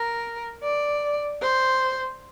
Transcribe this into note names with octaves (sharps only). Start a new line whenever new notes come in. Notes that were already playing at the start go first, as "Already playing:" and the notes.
Already playing: A#4
D5
C5